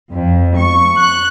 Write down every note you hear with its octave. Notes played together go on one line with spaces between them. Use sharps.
F2
C#6
F#6